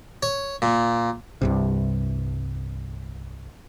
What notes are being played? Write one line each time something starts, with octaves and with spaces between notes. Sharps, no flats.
C#5
A#2
C2 G2 C3